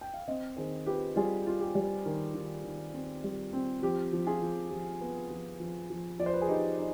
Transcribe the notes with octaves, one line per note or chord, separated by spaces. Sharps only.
G5
F5
C4 C5 D#5
D#3 G#4 C5
F4 G4 B4
G3 F4 G#4
F4
G4
G3
D#3
D#3
D#3
C4
G3
C4
F3 G4
F3
F4 G#4
F3
F3 G4
B3
F3
F3
F3
F3 D5
C5
B4
G#4
D#4 G4
D#4